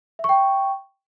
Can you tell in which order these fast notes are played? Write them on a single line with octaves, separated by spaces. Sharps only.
E5 C#6 G5